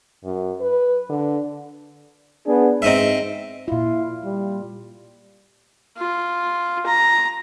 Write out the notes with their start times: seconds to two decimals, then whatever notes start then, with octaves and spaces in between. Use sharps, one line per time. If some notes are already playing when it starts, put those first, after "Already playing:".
0.24 F#2
0.61 B4
1.10 D3
2.46 B3 D4 G#4
2.82 G#2 C4 D#4 E5
3.68 A#2 E4 F4
4.25 G3
5.98 F4
6.86 A#5